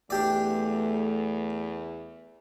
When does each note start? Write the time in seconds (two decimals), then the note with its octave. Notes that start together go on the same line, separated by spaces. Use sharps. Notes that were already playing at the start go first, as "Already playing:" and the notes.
0.10 E2 A3 D4 G4 D5